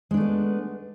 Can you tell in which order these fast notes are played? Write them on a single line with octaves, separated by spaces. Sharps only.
G#3 D4 A3 B3